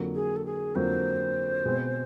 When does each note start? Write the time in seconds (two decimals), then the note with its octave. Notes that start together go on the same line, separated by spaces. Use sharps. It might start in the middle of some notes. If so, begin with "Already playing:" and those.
Already playing: F2 D3 F#3 A#3
0.15 G#4
0.36 A4
0.46 G#4
0.75 F2 D3 F#3 A#3 C5
1.65 B2 G#3 C4